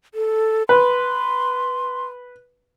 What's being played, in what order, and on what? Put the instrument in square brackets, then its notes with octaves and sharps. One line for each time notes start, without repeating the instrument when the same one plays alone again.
[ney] A4
[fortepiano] B4 [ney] C6